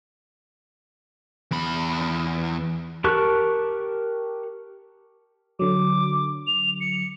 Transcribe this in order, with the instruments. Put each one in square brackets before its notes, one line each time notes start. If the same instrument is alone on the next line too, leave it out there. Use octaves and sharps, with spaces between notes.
[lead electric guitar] E2 B5
[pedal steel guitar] G4 A#4 A5 C#6 F#6
[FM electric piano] D3 F#3 [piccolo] D6
[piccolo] F7
C#7